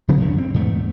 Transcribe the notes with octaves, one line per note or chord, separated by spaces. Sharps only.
C#3 F3 B3 C#4
E2 G2 D3 C#4
C4
E2 G#2 A3